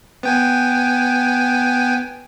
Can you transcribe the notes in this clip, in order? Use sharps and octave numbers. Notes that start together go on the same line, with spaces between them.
B3 G5 G#5